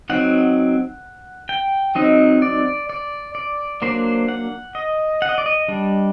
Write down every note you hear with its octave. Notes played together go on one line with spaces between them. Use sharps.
F#3 C4 D#4 F#5
G5
F#3 C4 D#4 D#5
D5
D5
D5
F#3 A#3 D4 C5
F#5
D#5
F#5
D#5
D5
D#5
G3 D4